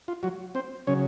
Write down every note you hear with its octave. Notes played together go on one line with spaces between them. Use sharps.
F4
F#3 F#4
C4 C5
C#3 F#3 C#4 C#5